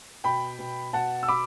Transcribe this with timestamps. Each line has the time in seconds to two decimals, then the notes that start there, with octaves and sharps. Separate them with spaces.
0.24 B2 G5 B5
0.59 B2
0.93 B2 F#5 A5
1.23 E6
1.28 B2 B5 D6